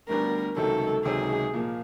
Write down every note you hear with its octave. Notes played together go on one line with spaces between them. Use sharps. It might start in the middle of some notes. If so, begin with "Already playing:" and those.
D2 D3 G3 B3 D4 A#4
C#2 C3 D#3 F#3 A4
C#2 C3 D#3 F#3 G#4
A#2 F3 A#3